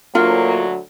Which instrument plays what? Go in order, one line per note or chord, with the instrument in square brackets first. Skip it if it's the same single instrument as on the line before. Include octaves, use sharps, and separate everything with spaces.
[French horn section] D2 F#3 [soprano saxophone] A#3 [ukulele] F4